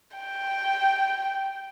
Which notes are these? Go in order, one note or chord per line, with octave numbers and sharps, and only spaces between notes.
G5